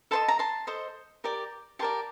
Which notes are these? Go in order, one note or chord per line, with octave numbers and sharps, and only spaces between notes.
A4 C5 D#5 A5 C6
A#5
A5 C6
A4 C5 D#5
G4 A#4 D5
G4 A#4 D5 A5 C6